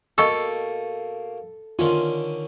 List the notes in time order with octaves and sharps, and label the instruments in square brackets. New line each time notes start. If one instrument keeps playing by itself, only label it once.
[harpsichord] B2 A#3 [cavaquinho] A4 [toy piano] D#5 C#6 E6
[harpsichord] D3 D#3 C#4 [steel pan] F4